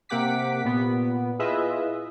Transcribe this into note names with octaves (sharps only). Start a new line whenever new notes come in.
C3 A#3 G4 F#5 D6 B6
A#2 B3
E4 F4 G#4 B4 D#5 E5